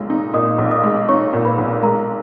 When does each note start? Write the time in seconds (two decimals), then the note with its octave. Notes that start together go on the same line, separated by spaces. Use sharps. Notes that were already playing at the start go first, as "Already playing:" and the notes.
Already playing: B1 A#2 G#3
0.10 D#4
0.33 A#2 D#5 D#6
0.58 B1
0.71 D#5 D#6
0.83 G#3
1.09 D#4 C#5 C#6
1.33 A#2
1.45 B4 B5
1.58 B1
1.82 G#3 A#4 A#5